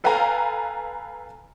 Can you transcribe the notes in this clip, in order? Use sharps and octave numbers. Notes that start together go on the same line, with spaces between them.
A4 B4 F5 G5 G#5 A#5